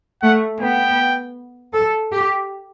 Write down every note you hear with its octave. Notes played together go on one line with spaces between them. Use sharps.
A3 F#5
B3 G5
A4
G4